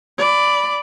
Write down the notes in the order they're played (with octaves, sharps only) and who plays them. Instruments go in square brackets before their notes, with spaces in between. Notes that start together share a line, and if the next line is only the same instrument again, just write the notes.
[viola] D5 B5